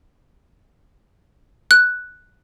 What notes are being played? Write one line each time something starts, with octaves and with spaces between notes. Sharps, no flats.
F#6